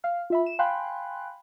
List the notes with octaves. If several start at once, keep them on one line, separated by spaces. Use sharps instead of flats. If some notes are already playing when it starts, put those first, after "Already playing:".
F5 F6
F4 E5 B5
E7
F5 G5 G#5 B5 C6 F#6